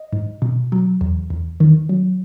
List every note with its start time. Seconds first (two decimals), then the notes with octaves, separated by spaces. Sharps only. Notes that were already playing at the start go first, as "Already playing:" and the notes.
Already playing: D#5
0.12 G#2
0.42 B2
0.72 F#3
1.01 E2
1.30 E2
1.60 D#3
1.89 F#3